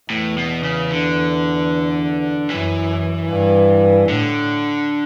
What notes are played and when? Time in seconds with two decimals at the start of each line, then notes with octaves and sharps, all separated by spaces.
0.10 E2 A2
0.38 B2
0.63 C#3
0.91 D3
2.50 F#2 E3
3.29 G2
4.09 A2 D3